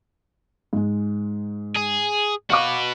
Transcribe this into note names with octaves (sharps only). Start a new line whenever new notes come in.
G#2 G#3
G#4
F#4 B4 F5 C#6 D6